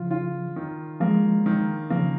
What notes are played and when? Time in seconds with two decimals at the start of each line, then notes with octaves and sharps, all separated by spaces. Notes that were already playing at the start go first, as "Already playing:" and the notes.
Already playing: C#3 F3 F4
0.11 F4
0.56 D#3
1.00 F3 G#3 A#3
1.46 D#3
1.90 C#3 F3 A#3